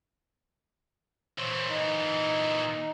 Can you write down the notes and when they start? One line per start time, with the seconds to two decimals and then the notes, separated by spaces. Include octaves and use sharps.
1.38 A#2 E3 C5 C#5
1.70 D#4